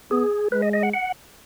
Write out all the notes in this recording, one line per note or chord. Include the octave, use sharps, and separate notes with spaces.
B3 G#4
G#3 B4
D#5
D#5
F#5
F#5